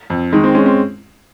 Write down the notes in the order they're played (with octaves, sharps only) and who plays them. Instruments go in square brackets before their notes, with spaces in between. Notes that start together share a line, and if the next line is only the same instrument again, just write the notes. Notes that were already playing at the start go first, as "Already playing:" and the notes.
[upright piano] F2
[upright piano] D#3 [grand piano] G#3
[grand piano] C4
[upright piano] G#3 [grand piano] C#4
[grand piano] C4